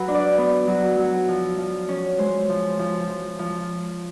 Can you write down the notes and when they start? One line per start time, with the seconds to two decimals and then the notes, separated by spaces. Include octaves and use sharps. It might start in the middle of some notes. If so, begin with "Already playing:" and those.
Already playing: F#3 B4
0.08 D4
0.15 D5
0.38 B3
0.67 F#3
0.98 F#3
1.28 F3
1.58 F3
1.89 C#4
2.18 G#3 C5
2.49 F3
2.79 F3
3.09 F3
3.39 F3